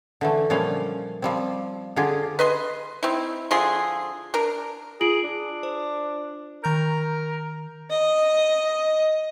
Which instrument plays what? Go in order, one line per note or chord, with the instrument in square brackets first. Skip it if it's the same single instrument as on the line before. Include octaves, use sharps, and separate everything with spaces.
[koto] D3 E3 A3
A#2 F3 G3 C#4 F5
F3 G3 C4
D3 F4 G4 G#4
[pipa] B4 D#5 C6
C4 D#4 E4
D3 F3 G#4 C6
D4 A#4
[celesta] F4 D7 F#7 [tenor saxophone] G#4
[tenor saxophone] D4
[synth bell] C5
[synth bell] D#3 A#5 G6 [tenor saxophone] A#4
[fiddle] D#5